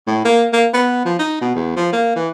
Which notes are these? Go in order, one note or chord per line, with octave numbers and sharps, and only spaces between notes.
A2
A#3
A#3
B3
F3
D#4
B2
E2
F3
A#3
E3